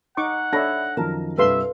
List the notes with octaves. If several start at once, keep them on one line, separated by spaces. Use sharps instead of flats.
D#4 F#5 C#6 D6
D4 A4 C#5 E5 B5 A#6
F#2 D#3 F3 A#4 A5
C2 G2 A4 B4 E5 F5 C6